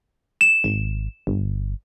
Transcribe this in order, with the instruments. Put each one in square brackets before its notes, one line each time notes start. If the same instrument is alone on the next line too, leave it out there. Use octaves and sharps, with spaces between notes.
[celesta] E7
[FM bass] G#1
G1